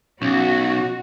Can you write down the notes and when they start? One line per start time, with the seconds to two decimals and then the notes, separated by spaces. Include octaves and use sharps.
0.22 B1 C#4 F#4